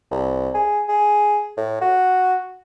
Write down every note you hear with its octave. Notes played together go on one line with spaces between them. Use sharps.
C2
G#4
G#4
A2
F#4